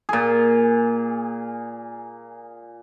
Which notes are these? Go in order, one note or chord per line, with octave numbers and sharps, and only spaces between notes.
A#2 G#4